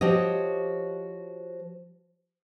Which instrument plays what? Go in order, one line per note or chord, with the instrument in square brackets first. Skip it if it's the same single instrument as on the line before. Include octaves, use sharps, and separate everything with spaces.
[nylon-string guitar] F3 F#4 G4 C#5 D#5